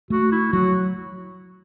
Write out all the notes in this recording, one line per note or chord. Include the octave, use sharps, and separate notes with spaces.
A3 F#4
E4
F#3 F#4